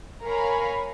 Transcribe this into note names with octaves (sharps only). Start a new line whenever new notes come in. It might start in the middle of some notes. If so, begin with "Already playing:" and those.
A#4 C#5 F5 G#5 A#5 B5